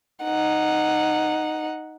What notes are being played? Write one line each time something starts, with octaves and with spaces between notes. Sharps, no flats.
D#4 F#5